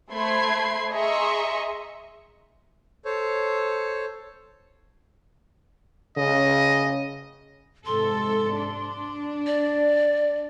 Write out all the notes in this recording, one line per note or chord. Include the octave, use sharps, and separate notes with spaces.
A3 C5 B5 C6 G#6 C7
G#4 D#5 E5 A#5 C6 C#6
A4 C5 C#5
C#3 D#5
G#2 C3 A4 C6
D4
D5